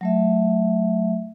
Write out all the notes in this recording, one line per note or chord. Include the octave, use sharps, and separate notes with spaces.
F#3 A3 E5